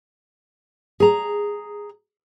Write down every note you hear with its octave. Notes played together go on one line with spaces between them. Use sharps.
G#4 A#5